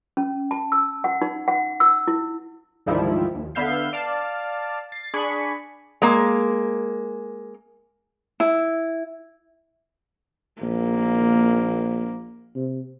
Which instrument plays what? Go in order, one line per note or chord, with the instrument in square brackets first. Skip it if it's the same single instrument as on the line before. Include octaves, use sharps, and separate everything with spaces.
[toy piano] C#4
A5
E6
F#5
D#4
F#5
E6
E4
[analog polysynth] D2 G#2 D#3 F3 G3 E4
D#2
D3 B3 E5 F5 G6 C7
D5 F5 A5
A6 C7
D4 G#4 B5 C#6
[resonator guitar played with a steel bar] G#3 A#3
[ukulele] E4
[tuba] A#1 [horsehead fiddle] A#3
[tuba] C3